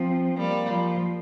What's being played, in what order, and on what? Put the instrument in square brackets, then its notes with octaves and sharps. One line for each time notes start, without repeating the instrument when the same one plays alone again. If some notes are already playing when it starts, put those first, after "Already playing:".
Already playing: [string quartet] F3 [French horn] C4
[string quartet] G3 [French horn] A#3
[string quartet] F3